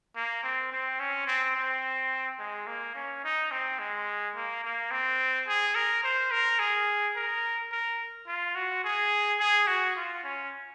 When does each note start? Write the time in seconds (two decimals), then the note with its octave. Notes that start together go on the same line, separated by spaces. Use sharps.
0.16 A#3
0.43 C4
0.72 C4
1.00 C#4
1.27 C4
1.56 C4
2.39 G#3
2.67 A#3
2.95 C#4
3.24 D#4
3.52 C4
3.79 G#3
4.36 A#3
4.64 A#3
4.91 C4
5.48 G#4
5.75 A#4
6.04 C5
6.31 A#4
6.59 G#4
7.16 A#4
7.72 A#4
8.27 F4
8.55 F#4
8.84 G#4
9.40 G#4
9.67 F#4
9.96 F4
10.24 C#4